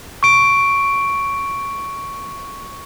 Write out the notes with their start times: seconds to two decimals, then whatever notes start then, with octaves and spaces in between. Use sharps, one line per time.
0.23 C#6 D7